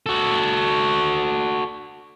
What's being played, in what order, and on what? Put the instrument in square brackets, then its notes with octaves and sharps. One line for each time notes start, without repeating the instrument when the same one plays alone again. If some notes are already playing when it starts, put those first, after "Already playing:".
[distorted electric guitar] F#4 A4